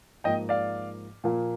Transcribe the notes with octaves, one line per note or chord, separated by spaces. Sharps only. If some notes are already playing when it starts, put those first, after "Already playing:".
G#2 F3 A#3 D#5 G5
D5 F5
A#2 F3 A#3